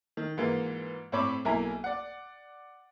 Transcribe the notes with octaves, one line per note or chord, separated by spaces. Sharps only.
D#3
G#2 E3 A#3 F4
A2 C4 C#5 B5 D6
B1 A#3 E4 G#5 A#5
D5 F#5